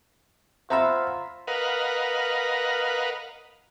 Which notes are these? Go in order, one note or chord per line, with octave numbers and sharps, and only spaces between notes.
F4 C5 E5 F#5 A#5 B5 E6
A#4 B4 D#5 F5 F#5